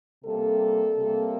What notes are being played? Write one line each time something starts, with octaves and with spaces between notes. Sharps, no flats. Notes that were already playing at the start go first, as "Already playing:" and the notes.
C3 G3 A#3 A4
C3 G3 A#3